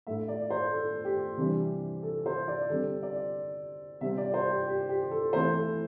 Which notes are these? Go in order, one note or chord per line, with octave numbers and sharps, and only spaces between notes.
A2 A3 D4 E5
D5
C5
A4
G4
C3 E3 G3 D4
A4
C5
D5
D3 G3 C4 A4
D5
C3 G3 C4 E5
D5
C5
G4
G4
G4
A4
E3 A3 C4 E4 C5
A4